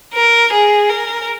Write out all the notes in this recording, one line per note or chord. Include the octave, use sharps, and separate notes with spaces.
A#4
G#4
A#4